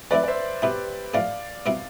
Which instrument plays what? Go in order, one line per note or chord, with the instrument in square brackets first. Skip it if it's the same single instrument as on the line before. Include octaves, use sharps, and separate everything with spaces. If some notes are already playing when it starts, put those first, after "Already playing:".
[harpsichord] F3 A3 C4 E4 [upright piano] B4 D5
[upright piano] D5
C5 E5
[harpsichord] B2 B3 E4 [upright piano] G4 B4
[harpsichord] A2 F3 A3 D4 [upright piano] D5 F5
[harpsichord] B2 G3 C4 E4